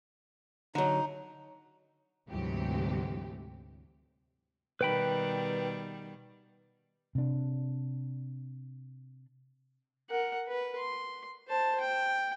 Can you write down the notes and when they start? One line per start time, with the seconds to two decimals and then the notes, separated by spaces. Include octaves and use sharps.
0.75 D3 F#3 D#4
2.29 D2 G#2 C3 E3 F#3 G4
4.81 B2 D#3 G3 B4 G5 B5
7.15 C3 D4
10.10 A#4 F#5
10.48 B4
10.78 C6
11.48 C5 A5
11.80 G5